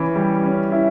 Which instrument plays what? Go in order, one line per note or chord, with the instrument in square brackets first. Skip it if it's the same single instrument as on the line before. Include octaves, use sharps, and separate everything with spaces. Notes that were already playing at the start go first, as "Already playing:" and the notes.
Already playing: [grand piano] E3 C#4 E4
G3
C#4
E4